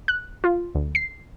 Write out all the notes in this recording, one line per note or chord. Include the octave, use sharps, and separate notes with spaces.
F#6
F4
D2
C7